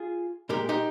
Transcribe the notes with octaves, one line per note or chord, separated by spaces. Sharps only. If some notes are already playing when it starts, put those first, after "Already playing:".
Already playing: F4 G#4
A#2 G#3 G4 A#4
D#4 G4